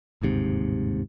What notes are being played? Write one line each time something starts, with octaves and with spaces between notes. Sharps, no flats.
G1 D#2 G#2 C3